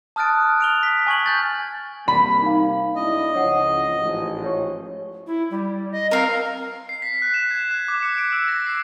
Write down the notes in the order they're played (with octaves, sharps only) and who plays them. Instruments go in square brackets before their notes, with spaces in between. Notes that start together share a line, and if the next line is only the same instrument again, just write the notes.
[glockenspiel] A5 D#6 F6 F#6 A6 D7
D7 F7 G7
B6
G#5 C#6 G#6 F#7
F6 G6 A6
[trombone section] C3 G3 A#3 [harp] B5
[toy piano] D#4 F5
[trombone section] B1 D4 E4 [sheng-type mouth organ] D#5
[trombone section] C#2 F3 [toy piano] C#5 F#5
[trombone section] A1 G#2 F3
[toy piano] G4 C#5
[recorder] E4
G3
D#5
[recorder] C4 [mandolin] A#4 F5
[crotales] C7
B6
F#6
E7
G#6
F#6
D6
C#7
D7
E6
A#6
C7